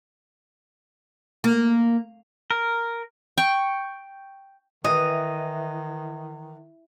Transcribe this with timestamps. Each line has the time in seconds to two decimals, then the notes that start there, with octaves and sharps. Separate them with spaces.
1.44 A#3
2.51 A#4
3.38 G5 C#6
4.84 D#3 E3 D#5